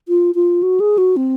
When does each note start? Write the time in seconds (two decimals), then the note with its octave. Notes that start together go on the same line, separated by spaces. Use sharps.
0.08 F4
0.35 F4
0.63 F#4
0.80 G#4
0.98 F#4
1.17 C4